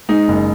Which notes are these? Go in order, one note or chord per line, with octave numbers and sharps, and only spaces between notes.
G#3 D#4
F#1